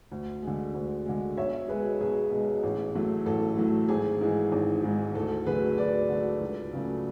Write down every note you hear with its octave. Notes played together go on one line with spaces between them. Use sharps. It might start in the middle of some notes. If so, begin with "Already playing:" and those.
D2
D3 G#3
D2
D3 G#3
B1 C#5 E5
B2 G#3 G#4 B4
B1 G#4
B2 G#3
A1
A2 F#3 A3
A1 A4
A2 F#3 A3
G#1 G#4
G#2 E3 G#3
G#1
G#2 E3 G#3
D2 A4
D3 F#3 A3 G#4 B4
D2 B4 D5
D3 F#3 A3
C#2
C#3 F#3 A3